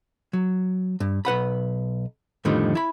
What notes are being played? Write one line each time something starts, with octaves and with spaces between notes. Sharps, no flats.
F#3
G2
B1 B4 F#5 B5
F2 A2 D3 D#3 F3 G3
E4 B5